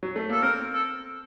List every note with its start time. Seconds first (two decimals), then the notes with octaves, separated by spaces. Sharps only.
0.03 F#3
0.16 A3
0.30 A#3 A4
0.42 C4 A#4
0.73 A4